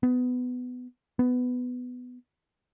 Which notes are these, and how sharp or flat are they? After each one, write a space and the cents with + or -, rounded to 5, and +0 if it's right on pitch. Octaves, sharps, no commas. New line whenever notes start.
B3 +15
B3 +10